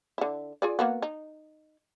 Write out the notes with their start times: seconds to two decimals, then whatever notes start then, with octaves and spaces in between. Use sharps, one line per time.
0.18 D3 E4
0.62 F4 G#4 D5
0.79 A#3 B3 F#4
1.02 D#4